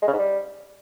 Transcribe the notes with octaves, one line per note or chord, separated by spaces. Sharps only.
G#3
C#3
G#2
G3